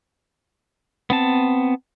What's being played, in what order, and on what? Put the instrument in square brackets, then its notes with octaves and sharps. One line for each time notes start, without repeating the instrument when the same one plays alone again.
[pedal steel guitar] B3 C4 A5